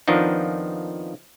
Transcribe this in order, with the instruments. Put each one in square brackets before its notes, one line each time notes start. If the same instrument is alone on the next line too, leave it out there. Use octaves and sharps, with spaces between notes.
[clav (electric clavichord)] F2 D#3 F3 B3 D4 D#4